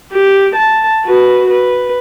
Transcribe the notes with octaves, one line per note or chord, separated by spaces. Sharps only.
G4
A5
F#4 B4
B4